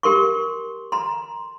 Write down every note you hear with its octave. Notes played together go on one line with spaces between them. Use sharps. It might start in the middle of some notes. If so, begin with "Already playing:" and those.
G4 A#4 C6 C#6
A#5 C6